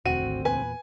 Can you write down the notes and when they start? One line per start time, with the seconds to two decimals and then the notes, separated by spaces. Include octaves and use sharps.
0.06 E1 D2 C4 F#4 D#7
0.23 G#1
0.45 E2 A#2 B4 G#5